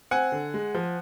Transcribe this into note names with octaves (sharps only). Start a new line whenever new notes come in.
C4 F#5 G#5
D3
G#3
F3